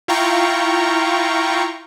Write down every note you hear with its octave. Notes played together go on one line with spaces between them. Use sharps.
E4 F4 F5 G5 A#5 C#6